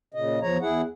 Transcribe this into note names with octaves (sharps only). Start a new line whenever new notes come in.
A#2 C#3 D#5
E2 F3 C#5 A#5
E2 E4 G#4 F#5